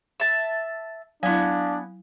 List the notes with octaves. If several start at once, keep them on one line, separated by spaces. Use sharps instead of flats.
E5 A5
F#3 B3 D4 E4 F5 G#5